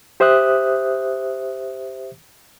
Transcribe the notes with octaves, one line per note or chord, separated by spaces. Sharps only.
G4 C5 E5 D#6 F#6